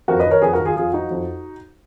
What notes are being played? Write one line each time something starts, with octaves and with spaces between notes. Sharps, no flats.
F2 F#4 A#4
B4 D#5
D#3
A#4 C#5
F2 G#4 B4
F#4 A#4
D#3
F4 G#4
F2 F4 G#4
F3 D#4 F#4
F2